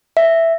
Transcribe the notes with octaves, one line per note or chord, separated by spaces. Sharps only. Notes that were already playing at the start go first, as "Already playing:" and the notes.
E5